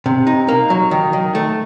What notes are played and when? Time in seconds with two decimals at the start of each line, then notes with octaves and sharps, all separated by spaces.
0.06 C3
0.27 D#4
0.48 A#3
0.70 F#3
0.91 D#3
1.13 D#3
1.35 A3